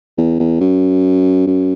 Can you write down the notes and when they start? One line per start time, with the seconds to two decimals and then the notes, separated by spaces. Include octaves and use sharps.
0.18 E2
0.40 E2
0.60 F#2
1.47 F#2